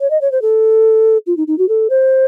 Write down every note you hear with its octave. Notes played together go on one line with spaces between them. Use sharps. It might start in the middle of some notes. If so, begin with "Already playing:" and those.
C#5
D#5
C#5
C5
A4
F4
D#4
D#4
F#4
A4
C5